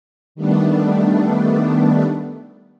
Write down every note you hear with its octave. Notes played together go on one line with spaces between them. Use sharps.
D#3 G3 A3 B3 D4